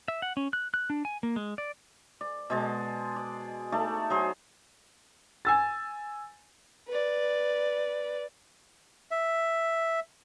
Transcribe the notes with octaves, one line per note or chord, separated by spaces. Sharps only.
E5
F#5
C#4
F#6
F#6
D4
G#5
A#3
G#3
D5
D5
B2 G#3 A5
D5
A3 D#4 D5 A5
F#3 G#4 C5
G#5 E6 A6
B4 D5
E5